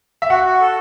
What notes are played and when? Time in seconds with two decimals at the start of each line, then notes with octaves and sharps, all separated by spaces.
0.22 E5
0.30 F#4 F#5
0.45 F#4
0.61 A4